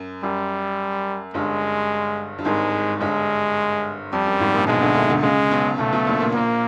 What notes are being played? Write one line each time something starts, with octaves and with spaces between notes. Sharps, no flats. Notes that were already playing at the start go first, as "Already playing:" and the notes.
Already playing: F#2
F#2 G3
G1 G2 G#3
G2
G#1 G#2 G#3
G1 G2 G#3
F2 G3
F#2
G#1 G#2
A#1 A#2
B1 B2 G#3
D2 D3
D2 D3
D2 D3
C#2 C#3 G#3
B1 B2
B1 B2 A3
B1 B2
A#1 A#2
A#1 A#2
A#3